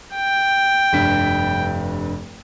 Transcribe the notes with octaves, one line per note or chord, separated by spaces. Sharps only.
G5
F1 G2 B6